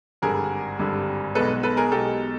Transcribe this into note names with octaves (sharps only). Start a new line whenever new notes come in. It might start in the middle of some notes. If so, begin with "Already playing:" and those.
G#1 G2 D3 G3 G#4 A#4
G#1 G2 D3 G3
B1 B2 G#3 A4 B4
A4 B4
G#4 A#4
B1 B2 G#3 G4 A4